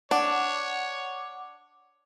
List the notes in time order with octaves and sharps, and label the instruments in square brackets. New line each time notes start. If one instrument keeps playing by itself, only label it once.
[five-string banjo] D4 [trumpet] C#5 [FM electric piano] F#5 D6